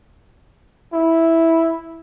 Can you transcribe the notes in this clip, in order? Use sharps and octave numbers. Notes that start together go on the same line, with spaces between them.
E4